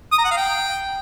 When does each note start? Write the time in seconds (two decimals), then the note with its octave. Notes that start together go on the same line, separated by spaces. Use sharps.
0.12 D#6
0.18 A#5
0.25 F#5
0.31 F5
0.37 G5